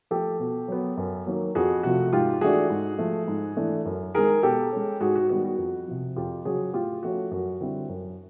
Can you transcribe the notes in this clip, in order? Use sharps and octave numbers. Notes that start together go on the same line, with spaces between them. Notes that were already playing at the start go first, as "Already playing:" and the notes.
F3 A3 G4 A4
B2
F#3 B3
F#2
D#3 F#3 A#3
F2 F#4 G#4
C3 F3 A3 F#4
G#2 F4 G4
E3 A3 D4 F#4 G#4
G#2
F3 A3
G#2
E3 A3 D4
F#2
D#3 G#3 G#4 A#4
B2 G4 A4
G#3 C#4
G#2 F#4 G#4
F#4
D#3 G3 B3 F#4
F#4
F2
C3 F3
F2 F4 G4
C#3 F#3 F#4 G#4
A2 F4 G4
F3 A3 C#4 F#4
F#2 F#4
D3 G3 C4 E4
F#2